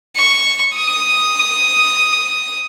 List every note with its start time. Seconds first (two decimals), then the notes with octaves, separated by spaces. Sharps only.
0.17 C#6
0.75 D#6